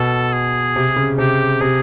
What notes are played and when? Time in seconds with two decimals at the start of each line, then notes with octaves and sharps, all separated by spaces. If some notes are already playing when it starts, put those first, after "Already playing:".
Already playing: B2 A4
0.33 G#4
0.76 C3
0.96 C#3
1.18 C3 G4
1.60 C3 G#4